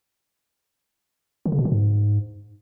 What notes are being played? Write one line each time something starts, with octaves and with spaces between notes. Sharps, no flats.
D#3
C#3
B2
D#3
G#2